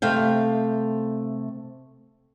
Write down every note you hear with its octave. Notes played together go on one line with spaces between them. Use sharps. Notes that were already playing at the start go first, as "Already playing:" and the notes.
C3 A3 F5 G5